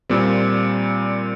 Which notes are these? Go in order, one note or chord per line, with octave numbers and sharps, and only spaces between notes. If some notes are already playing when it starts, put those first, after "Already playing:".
A#2 G3 C4